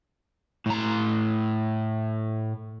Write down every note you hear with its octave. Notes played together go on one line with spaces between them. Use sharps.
A2 A#5